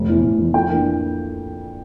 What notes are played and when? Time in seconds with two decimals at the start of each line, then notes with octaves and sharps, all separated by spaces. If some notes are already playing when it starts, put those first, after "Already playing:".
Already playing: F1
0.09 E2 E3
0.24 F1
0.39 E2 E3
0.54 F2 G5
0.69 E3 A#3 D4